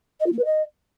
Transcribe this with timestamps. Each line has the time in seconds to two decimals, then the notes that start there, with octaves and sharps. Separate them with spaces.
0.20 D#5
0.26 F4
0.32 A#3
0.38 B4
0.44 D#5